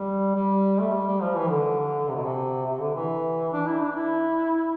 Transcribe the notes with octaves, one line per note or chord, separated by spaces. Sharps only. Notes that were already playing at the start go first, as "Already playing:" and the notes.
Already playing: G3
G3
A3
G3
G3
F3
E3
D3
C3
B2
C3
C3
D3
E3
D4
E4
D4
E4